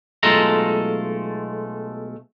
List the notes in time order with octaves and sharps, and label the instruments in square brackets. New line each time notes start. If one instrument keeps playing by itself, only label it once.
[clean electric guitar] B1 G#3 A3 F4 A4 A#5